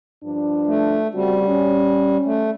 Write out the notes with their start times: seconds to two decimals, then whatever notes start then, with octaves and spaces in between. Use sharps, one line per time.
0.24 G2 F3 D4
0.67 A3
1.14 C#3 G3 C4 F#4
1.47 C#4
2.25 A3